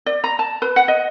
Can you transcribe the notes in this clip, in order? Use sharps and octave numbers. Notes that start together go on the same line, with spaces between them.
D5
A#5
A5
B4
F#5
D#5